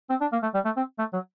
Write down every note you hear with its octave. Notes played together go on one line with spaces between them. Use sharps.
C4
D4
A#3
A3
G3
A3
C4
A3
F#3